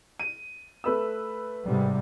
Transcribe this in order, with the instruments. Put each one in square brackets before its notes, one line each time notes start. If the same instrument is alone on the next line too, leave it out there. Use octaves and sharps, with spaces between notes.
[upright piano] D#7
A3 B4 E6
[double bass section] G#2 C3 G3